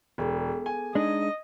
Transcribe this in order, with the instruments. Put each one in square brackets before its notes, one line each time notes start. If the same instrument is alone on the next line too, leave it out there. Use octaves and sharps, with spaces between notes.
[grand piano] E1 [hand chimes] B3 G#4 A4
[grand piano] G#5
[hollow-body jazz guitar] G#3 D4 D#4 [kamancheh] D#5